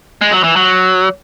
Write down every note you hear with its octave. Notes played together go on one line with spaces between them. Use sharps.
G#3
F#3
E3
F#3